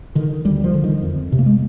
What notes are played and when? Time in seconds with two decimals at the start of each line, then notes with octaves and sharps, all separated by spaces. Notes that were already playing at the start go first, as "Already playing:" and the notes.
0.15 D3 D#3
0.45 D2 G3
0.64 F3
0.74 D3
0.84 D#3
1.02 F2
1.32 C3
1.39 A#3
1.46 G#3